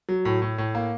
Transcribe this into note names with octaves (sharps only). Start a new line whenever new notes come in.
F#3
A2
A2
A2
A#3